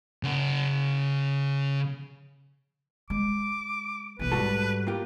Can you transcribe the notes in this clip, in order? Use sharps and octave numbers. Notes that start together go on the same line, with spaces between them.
C#3 F#5
G#3 D6
B1 E3 B4
G#2 G3 F#4 A4
A#3 F4 G4